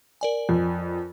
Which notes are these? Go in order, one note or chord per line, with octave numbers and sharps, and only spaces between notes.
A#4 D5 G#5
F2